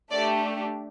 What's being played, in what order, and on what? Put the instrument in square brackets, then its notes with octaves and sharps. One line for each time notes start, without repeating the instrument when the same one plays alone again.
[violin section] A3 D4 G4 D5